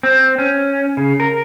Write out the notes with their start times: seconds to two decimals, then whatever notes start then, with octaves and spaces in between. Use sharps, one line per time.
0.03 C4
0.38 C#4
0.97 C#3
1.20 A#4